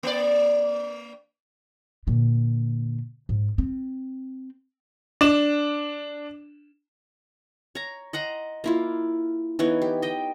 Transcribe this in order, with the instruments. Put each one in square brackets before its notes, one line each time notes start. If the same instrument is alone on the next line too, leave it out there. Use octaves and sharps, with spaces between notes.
[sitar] A#3 D5
[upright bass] A#2 D3
G#2
C4
[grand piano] D4 E7
[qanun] C#5 A#5
D#5 F#5 A#5 C6
A#3 E4 F4
E3 B3 D#4 C#5
G4
D#5 G5